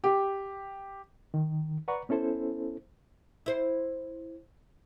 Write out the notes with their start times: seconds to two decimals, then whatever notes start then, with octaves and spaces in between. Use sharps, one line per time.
0.04 G4
1.34 D#3
1.88 B4 D5 F#5 A#5 C#6
2.09 B3 C#4 E4 A4 C5
3.46 E4 C5